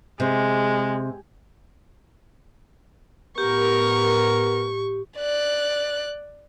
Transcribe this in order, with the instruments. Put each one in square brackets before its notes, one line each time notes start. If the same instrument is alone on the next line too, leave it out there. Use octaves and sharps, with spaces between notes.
[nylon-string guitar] C3 [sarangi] G#3
[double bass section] A2 [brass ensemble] B3 A#4 [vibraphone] G4 [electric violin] C#6
[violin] D5 F#6